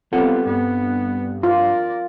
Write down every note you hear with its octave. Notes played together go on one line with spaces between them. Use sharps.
G3 B3 C4 F4 A4 F#5
G2 B3
F4 A#4 D5